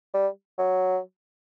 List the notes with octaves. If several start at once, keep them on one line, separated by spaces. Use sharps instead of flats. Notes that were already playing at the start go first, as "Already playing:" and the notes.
G3
F#3